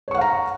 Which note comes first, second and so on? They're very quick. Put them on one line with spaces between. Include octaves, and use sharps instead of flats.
C#5 C#6 F#5 F5 A#5